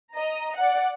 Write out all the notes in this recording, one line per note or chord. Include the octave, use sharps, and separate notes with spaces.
D#5 A#5
D5 F#5